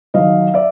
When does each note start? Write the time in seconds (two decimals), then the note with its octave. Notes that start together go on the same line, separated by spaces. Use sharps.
0.14 D#3 F#3 D#5 F5
0.54 D5 E5